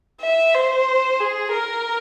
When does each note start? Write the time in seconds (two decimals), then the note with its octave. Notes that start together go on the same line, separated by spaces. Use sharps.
0.21 E5
0.54 C5
1.20 G#4
1.53 A#4